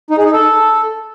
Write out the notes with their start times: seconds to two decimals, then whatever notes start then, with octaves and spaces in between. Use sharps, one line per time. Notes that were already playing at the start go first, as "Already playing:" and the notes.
0.10 D#4
0.18 G#4
0.25 D#4
0.33 A4